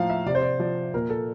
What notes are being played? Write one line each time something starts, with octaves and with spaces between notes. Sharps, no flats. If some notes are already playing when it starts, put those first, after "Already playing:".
Already playing: A2 F3 F5 A#5
E5
C3 D5
C5
D5
F3 D5
A#2 A#4
A4